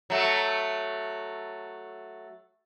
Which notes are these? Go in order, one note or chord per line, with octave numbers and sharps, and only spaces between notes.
F#3 A3